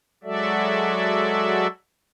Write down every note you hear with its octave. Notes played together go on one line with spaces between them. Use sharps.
F#3 G#3 F#4 A4 D5 E5